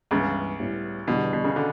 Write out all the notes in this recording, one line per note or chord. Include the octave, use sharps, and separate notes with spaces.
C#2 G2 C#3 E3 B3 E4
A2 G3 B3 E4 G4
E2 B2 D3 G3
B2
C#3
D3 F#4